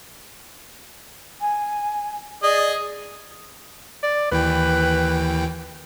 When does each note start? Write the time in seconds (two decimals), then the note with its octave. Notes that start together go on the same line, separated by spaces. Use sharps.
1.41 G#5
2.43 G#4 D5 D#5
4.03 D5
4.31 D#2 E3 B4 G5